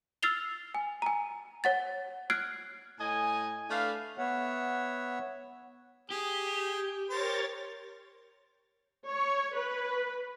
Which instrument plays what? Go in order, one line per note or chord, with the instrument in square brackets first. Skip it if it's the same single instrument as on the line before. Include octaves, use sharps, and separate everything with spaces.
[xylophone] E6 F6 A6 C7 F7 G7
G#5
G#5 A#5
C#5 F#5 A6
F6 F#6 G#6 C7 D7
[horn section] A2 D#5 G#5
A3 D4 B4 F5
[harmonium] B3 C#5 E5 F#5
[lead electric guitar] G4 [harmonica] G#4
[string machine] A#4 C#5 A6 [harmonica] C5
[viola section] C#5
B4